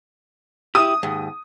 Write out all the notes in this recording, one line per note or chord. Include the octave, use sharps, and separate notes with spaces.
E4 G4 D#6
D#2 G#2